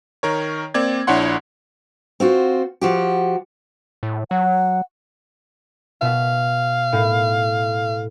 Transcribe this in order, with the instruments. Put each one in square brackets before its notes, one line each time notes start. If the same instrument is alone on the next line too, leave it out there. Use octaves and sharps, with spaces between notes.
[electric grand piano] D#3 A#4 C#5
A#3 C4 D5 G#6
A#1 D4 E4 C#5 F#5 C6
[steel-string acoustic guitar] C4 F4 F#4
F3 F#4 G4
[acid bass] A2
[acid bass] F#3 [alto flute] F#5
[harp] B2 E5 [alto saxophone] F5
[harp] A2